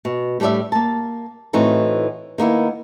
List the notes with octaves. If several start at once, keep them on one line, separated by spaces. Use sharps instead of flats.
B2
A2 G3 D4 F#4 D5 E5
A#3 A5
A2 E3 C4 D#4 F#4
D#3 A#3 B3 E4